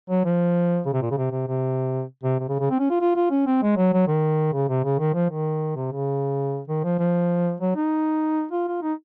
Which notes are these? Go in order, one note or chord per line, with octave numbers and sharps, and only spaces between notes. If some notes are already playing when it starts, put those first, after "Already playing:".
F#3
F3
C#3
C3
A#2
C#3
C3
C3
C3
C3
C3
C#3
C#3
C4
C#4
F4
F4
F4
C#4
C4
G#3
F#3
F#3
D#3
C#3
C3
C#3
D#3
F3
D#3
C3
C#3
D#3
F3
F3
F#3
D#4
F4
F4
D#4